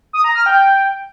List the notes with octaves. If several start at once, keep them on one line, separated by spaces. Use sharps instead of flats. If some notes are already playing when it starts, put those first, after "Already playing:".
D#6
A#5
F6
G5